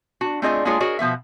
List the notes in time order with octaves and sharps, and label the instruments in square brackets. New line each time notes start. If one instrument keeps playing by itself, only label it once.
[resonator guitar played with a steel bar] D4 F#4
A3 C4 D4 F4 G#4 D#5
G#3 A#3 D4 F4 G#4 C#5
F#4 G#4 A#4 C#5 D#5
B2 F3 B3 E5